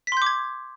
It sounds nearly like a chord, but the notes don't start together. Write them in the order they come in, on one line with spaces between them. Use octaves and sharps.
B6 C6 G6 D6 G#6